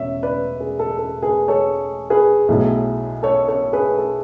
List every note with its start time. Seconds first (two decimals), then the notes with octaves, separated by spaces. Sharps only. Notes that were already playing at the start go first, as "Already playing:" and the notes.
Already playing: E1 C#3 C#5 E5
0.23 B4 D5
0.60 G#4
0.79 A4
0.98 A4
1.23 G#4 B4
1.48 A4 C#5
2.10 G#4 B4
2.48 B1 A2 F#3 A3
3.23 A4 C#5
3.48 A4 C#5
3.73 G#4 B4
3.97 A4